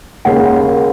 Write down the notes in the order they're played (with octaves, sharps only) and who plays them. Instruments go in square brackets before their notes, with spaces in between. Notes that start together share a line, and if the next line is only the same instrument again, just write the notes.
[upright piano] D#2 C#3 G#3 [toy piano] F#5